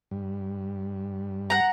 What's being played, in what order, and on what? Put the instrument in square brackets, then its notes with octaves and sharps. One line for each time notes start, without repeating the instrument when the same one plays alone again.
[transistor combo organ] G2
[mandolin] F#5 A#5